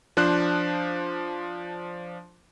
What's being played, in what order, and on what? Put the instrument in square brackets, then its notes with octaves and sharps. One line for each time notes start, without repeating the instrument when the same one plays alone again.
[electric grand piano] F3 D4 C5 F#6